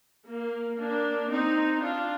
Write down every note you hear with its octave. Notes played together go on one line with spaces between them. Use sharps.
A#3
A#3 D4
C4 D#4
D4 F4